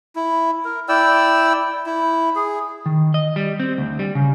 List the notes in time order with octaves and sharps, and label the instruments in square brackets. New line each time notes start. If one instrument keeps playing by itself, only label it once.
[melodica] E4
A#4
E4 D5 G5 E6
E4
G#4
[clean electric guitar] D#3
D#5
G3
C4
D2
G3
C#3